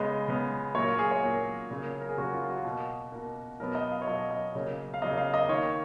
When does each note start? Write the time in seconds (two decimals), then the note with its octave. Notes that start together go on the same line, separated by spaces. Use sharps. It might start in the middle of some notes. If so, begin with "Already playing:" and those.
Already playing: C#3 G#3 B3 D#5
0.28 C#3 G#3 B3
0.75 A#2 F#3 A#3 C#5
0.87 F4
0.99 G#4
1.11 C#5
1.23 A#2 F#3 A#3
1.71 C#3 F#3 A#3
2.00 A#4
2.09 G#4
2.18 C#3 F#3 A#3 F#4
2.33 F4
2.44 F4
2.50 F#4
2.65 B2 A#3
3.12 B2 A#3
3.60 B2 F#3 B3 A#4
3.75 D#5
3.91 F5
4.02 C#5
4.07 B2 F#3 B3 D#5
4.30 D#5
4.55 C#3 F#3 A#3
4.94 F5
5.02 C#3 F#3 A#3 D#5
5.17 F5
5.34 D#5
5.49 D#3 A#3 C#5